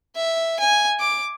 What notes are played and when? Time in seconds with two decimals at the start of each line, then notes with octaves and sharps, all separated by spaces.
0.16 E5
0.59 G#5
1.00 D6